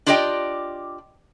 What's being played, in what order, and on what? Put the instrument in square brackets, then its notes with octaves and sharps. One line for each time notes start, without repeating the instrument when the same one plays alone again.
[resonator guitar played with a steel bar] D4 F4 G4 D5 D#5 G5